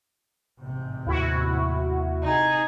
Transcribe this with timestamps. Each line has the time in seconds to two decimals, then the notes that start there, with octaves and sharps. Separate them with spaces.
0.60 A1 G#2 C3
1.07 D#2 E4 F#4
2.23 C3 D#4 G#4